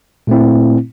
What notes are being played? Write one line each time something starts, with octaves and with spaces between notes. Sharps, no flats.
A#2 A3 C4 E4